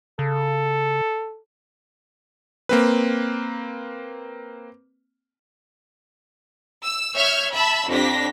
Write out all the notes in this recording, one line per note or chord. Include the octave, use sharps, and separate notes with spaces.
C#3 A4
A#3 C4 B4
E6
C#5 E5 F6 G6 G#6
E5 A5 B5 E6
F2 D4 G4 A#6 B6